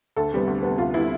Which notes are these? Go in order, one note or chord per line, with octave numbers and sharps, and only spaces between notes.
D2 A4
C3 G3 B3
D2
C3 G3 B3
D2 F4
C3 G3 B3 E4